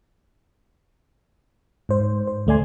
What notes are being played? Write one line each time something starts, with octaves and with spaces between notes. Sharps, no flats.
G#2 C5
C5
D2 A3 D5 G#5 C6